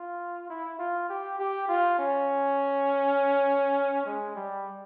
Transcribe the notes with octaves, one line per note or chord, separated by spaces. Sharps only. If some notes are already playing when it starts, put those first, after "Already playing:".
Already playing: F4
E4
F4
G4
G4
F4
C#4
G#3
G3